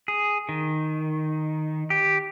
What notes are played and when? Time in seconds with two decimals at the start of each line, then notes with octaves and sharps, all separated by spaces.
0.08 G#4
0.49 D#3
1.90 G4